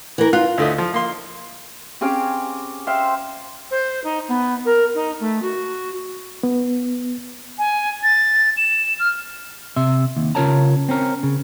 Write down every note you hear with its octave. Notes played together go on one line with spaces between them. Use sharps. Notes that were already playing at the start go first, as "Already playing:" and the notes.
E3 A#4
F4 F#6
D2 A3 D#5
F3
A#3 C6
C4 C#4 G4 G#4 F5 D6
C5 E5 F5 G5
C5
D#4
B3
A#4
D#4
A3
F#4
B3
G#5
A6
E7
F6
C3 E5 C6
D#2
C#3 F4 A#4 C#5 A5 A#5
C4 C#4 A#4
C#3